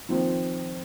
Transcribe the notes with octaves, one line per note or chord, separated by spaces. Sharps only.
D#3 F3 C4